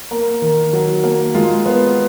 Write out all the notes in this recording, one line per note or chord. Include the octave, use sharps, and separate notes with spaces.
A#3 A#4
D#3
F#3
A#3
G#3 F4
B3